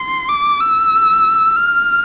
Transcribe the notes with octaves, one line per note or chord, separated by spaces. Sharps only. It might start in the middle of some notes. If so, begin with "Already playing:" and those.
Already playing: C6
D6
E6
F6